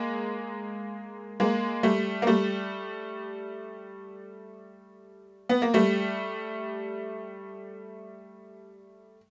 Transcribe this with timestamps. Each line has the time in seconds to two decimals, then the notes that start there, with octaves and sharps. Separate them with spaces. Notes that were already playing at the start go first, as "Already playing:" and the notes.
Already playing: G#3 A#3
1.40 G#3 A#3
1.83 G3 A3
2.22 A#3
2.27 G3 A3
5.49 B3
5.62 A#3
5.74 G3 A3